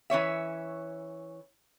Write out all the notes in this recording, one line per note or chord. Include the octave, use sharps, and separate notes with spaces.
E3 C#4 C#5 E5